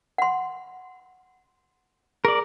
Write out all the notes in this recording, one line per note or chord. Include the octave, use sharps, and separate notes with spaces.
F#5 C6
G#4 A#4 D5